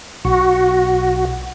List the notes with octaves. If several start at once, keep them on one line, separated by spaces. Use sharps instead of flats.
B1 F#4